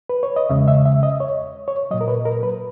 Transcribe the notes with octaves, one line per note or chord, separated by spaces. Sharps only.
B4
C#5
D#5
E2 C#3 G#3 E5
E5
E5
D#5
C#5
C#5
A#2 F#3 D#5
A#4
B4
A#4
B4